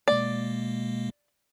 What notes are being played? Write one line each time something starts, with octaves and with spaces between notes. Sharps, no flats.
B2 G#3 A#3 D5